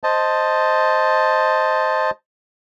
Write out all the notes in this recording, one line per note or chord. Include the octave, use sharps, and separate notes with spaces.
C5 D#5 A5